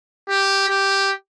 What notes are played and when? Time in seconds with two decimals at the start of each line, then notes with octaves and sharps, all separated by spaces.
0.29 G4
0.69 G4